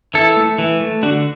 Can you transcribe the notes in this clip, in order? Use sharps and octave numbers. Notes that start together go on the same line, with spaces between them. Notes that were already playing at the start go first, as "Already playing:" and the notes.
E3 E4 A4
A3
E3
A3
D3 D4 F#4